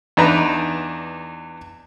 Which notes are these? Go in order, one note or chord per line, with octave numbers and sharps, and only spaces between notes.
E2 D4 D#4 B4 A#5